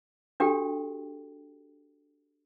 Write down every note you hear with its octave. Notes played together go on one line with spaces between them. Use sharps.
D4 F#4 G4 A4 G5